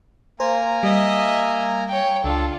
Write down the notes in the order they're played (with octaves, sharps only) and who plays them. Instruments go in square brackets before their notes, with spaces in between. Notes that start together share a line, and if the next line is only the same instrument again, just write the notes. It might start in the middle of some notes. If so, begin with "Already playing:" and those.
[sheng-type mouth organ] A#3 G#5 A#5 [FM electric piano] C5
[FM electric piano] G3 [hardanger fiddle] D#5 E5
[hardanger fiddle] C#5 G5
[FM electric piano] C#2 [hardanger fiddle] D4 F4 [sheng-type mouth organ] A4